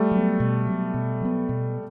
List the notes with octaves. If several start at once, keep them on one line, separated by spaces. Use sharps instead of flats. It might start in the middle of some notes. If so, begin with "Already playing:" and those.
Already playing: G3 A3
F#3 B3
B2
F#3 B3
B2
F#3 B3
B2